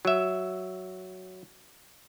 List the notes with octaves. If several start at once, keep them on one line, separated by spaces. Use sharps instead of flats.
F#3 E5